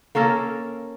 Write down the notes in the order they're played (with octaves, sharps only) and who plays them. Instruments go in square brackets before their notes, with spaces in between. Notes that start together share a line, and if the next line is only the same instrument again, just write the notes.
[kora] A#3 C#4 A4 A#4